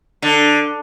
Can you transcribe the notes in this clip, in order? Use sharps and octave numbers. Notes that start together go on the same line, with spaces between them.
D3